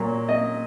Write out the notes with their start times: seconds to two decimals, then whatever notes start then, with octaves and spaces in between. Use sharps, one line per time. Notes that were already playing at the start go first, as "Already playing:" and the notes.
Already playing: A#2 F#3
0.29 D#5